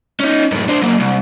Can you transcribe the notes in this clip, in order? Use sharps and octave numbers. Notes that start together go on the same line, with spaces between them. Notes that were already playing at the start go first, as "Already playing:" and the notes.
C#4 D#4
F#2 A2
D4 C5
F#3 A#3
C2